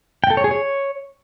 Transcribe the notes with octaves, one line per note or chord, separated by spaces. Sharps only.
G5
A4
C#5
G#4
C#5